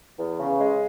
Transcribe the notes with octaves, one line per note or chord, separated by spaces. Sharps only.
E2
C#3
G#3